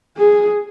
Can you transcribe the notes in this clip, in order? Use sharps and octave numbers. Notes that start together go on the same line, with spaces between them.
G#4